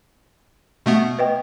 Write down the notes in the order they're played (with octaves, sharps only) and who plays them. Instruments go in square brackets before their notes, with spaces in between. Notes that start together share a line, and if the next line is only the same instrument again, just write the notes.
[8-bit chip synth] B2 A3 B3
[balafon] B4 D#5 G5